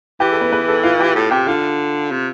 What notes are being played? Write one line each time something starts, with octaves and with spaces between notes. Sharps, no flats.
E3 G4
A4
B3 B4
B3 B4
A4
F4 F5
G4 G5
A2
C3 G4 G5
D3 F4 F5
C3